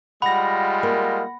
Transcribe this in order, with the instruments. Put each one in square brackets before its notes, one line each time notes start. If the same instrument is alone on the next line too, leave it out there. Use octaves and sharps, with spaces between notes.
[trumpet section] G3 G#3 F4 [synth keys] F#5 A#6 [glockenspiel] B5
[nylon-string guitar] A#3